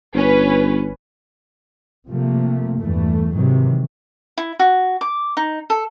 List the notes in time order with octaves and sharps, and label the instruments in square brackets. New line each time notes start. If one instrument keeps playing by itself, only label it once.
[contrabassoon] G1 [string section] C#4 B4
[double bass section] C3 F3 A3 A#3
E2 G2 E3 A3
G#2 C3 D#3 E3 F#3
[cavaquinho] E4
F#4
D6
D#4
A4